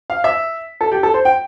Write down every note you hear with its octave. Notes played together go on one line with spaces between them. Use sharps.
F5
E5
A4
G4
A4
C5
G5